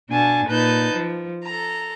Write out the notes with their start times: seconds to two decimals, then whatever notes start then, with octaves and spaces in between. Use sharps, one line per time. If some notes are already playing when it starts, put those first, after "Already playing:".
0.11 B2 D4 G#5 A5
0.48 A#2 D#4 B4 A5 G6
0.94 F3
1.45 A4 A#5